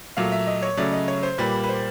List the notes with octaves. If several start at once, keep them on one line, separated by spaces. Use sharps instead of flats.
A#2 F#3 A3 F5
E5
D#5
C#5
C#3 F#3 A3 D5
D#5
C#5
C5
A#2 G3 A#3 B4
B4
C5